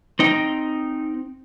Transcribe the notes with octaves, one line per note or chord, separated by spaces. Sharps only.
C4 D#4 G5